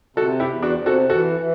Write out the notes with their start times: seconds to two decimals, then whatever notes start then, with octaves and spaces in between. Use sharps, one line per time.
0.17 C3 F#4 A4
0.40 E4 G4
0.47 E2
0.62 D4 F#4
0.78 C3
0.86 F#4 A4
1.09 E3 F#4 A4
1.39 E3